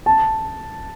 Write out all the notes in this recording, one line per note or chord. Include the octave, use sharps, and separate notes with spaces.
A5